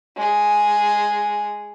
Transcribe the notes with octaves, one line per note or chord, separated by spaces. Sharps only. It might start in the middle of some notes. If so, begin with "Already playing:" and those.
G#3 G#4